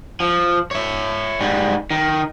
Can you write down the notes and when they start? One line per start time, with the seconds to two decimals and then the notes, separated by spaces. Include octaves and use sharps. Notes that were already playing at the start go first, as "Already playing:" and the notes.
0.20 F3
0.71 C#5 E5
1.40 G#2 G3
1.91 D#3